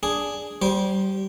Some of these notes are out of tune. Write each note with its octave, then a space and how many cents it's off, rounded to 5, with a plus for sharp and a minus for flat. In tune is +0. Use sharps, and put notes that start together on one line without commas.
D4 -5 G#4 +0
G3 -25 C5 +0